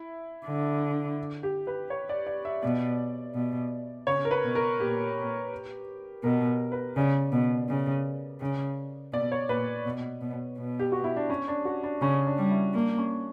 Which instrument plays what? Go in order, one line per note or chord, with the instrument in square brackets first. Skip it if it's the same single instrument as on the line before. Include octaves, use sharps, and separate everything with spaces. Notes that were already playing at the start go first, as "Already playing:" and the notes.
Already playing: [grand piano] E4
[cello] D3
[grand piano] G4
B4
C#5
D5
D5
E5
[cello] B2 [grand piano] D5
[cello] B2
[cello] C#3 [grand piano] C#5
[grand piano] A#4
B4
[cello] B2
[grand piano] A#4
[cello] A#2 [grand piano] G4
[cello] B2 [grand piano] A#4
[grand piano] B4
[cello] C#3 [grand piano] D5
[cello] B2
C#3
C#3
[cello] B2 [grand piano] D5
[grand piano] C#5
[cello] A#2 [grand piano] B4
[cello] B2
B2
B2
[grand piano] G4
F#4
E4
D4
C#4
D4
F#4
D4
[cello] C#3 [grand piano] C#4
[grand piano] D4
[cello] G3
[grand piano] E4
[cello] A#3 [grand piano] D4
[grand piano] C#4